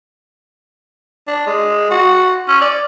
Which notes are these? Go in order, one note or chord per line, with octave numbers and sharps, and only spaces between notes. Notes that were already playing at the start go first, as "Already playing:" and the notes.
D4
G#3
F#4
C#4
D5